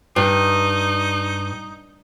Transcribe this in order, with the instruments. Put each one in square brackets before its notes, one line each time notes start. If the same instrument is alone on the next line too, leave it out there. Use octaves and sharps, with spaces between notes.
[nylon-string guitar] G2 [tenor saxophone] D#4